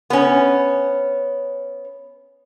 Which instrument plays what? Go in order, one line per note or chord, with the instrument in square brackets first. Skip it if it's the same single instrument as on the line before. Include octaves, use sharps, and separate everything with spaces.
[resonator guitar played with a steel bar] B3 C#4